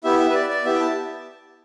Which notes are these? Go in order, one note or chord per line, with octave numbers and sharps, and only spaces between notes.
B3 E4 G4 E5
E5
B4
D5
D5
B3 E4 G4 E5
G5
A5